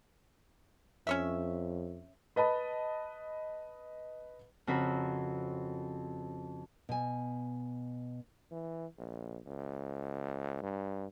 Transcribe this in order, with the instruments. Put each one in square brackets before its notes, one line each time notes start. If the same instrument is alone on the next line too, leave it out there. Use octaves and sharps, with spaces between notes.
[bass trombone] F2 [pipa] C#4 C#5 E5
[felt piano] B4 D#5 A5 B5
[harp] F2 C#3 C4 F#4 A#4 B5
[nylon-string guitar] B2 G#5
[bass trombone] E3
A#1
C#2
G2